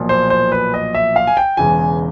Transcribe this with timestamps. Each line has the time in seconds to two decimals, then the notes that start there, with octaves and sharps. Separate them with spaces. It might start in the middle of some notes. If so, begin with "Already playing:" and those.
Already playing: B1 A#2 F3
0.09 C5
0.30 C5
0.52 B4
0.74 D#5
0.95 E5
1.16 F5
1.27 G#5
1.37 G5
1.57 E1 E2 C#3 E3 G#5